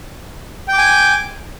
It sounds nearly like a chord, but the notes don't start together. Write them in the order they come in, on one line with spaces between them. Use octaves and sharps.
G5 D6 G#5